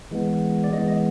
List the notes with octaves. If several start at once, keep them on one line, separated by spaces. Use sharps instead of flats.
E3 G#3 B3
D5
E3 G#3 B3 D#5
D#5